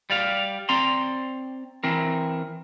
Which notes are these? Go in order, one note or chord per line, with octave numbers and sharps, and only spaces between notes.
G3 D5 F5
C4 D5 A#5 C6
E3 C4 A#4